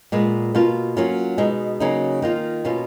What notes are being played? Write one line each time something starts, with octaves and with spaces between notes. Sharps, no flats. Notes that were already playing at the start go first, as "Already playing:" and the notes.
A#2 G#3 B3
B2 A#3 F4
F#3 A#3 C#4 F4
B2 G#3 D#4
C#3 F#3 A#3 D#4
D#3 A#3 F4
B2 A#3 C#4 F4